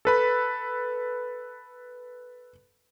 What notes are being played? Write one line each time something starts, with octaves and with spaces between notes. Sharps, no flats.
A4 B4 B5